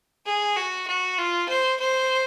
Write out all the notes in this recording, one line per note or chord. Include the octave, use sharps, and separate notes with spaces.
G#4
F#4
F#4
F4
C5
C5